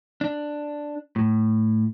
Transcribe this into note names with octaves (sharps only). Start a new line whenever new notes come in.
D4
A2